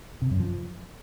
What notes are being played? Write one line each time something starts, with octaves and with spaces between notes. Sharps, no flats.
C3
F#2
F3